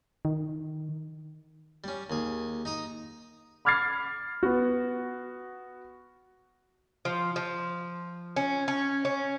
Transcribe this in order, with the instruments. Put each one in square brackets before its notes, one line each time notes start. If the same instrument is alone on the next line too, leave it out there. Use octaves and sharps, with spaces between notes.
[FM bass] D#3
[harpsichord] G3 C#4
D#2 G#4
D#4 A#5 D#6
[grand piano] B5 D6 F6 G#6 A6 C7
B3 F#4
[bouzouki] F3
F3
C#4
C#4
C#4